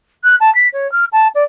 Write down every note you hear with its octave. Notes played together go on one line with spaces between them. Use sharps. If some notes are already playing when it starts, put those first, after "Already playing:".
F#6
A5
B6
C#5
F6
A5
D5